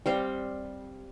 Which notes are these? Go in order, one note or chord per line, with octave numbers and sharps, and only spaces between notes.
G3 C4 F5